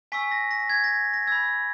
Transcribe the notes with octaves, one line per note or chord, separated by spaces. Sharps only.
G#5 C#6 E6 B6
A#6
A#6
G#6
A#6
A#6
B5 E6 G#6